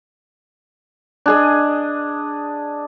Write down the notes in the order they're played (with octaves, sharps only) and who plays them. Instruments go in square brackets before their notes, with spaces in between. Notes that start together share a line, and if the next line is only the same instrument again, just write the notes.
[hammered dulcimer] D4 G#4 D#5